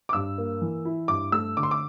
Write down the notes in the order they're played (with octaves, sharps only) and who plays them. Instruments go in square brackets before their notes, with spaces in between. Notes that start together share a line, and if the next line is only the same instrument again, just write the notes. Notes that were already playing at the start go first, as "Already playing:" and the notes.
[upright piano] D6
[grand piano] G2 [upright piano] E6
[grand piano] A#3
E3
E4
[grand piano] G2 [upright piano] D6
[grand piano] A3 [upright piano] E6
[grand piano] D3 [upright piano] D6
[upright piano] C6
D6